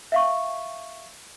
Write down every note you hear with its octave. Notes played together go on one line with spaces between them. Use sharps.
E5 F5 C#6